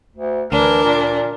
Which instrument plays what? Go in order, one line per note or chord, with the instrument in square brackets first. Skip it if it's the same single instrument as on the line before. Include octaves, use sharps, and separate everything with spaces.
[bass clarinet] D2
[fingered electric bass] D2 [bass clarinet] E3 [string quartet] D4 [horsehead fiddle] A#4
[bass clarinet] A#2